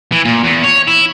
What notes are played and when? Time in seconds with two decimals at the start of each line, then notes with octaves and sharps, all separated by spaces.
0.12 E3
0.25 A#2
0.44 E2
0.64 C#5
0.88 E4